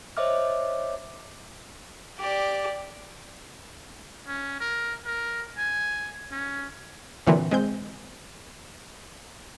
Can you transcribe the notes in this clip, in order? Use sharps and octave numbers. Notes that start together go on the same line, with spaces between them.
C5 C#5 D#5 E5 D6 F6
G4 D5
C#4
A#4
A#4
G#5
C#4
A#2 D3 E3 F#3 C4
G#3 C4 G6